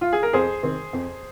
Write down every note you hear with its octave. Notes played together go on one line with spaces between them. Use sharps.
F4
G#4
A#4
F2 G#4 C5
D#3 C4
F2